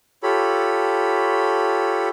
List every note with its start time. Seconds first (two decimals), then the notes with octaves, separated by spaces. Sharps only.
0.23 F4 G4 A4 C#5 B5